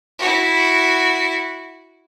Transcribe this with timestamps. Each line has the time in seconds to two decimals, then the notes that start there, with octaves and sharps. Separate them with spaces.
0.19 E4 F#4